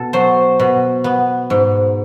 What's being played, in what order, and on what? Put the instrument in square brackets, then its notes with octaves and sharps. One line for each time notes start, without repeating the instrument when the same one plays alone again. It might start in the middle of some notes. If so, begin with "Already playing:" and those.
Already playing: [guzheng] B2 A4
F#3 C5
B2
B3
G#2